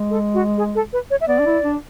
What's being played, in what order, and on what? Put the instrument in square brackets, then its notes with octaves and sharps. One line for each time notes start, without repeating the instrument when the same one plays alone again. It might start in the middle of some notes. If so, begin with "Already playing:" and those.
Already playing: [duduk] G#3
[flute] A4
F#4
G#4
A4
B4
C#5
E5
[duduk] B3 [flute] D5
[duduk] D4
E4
D4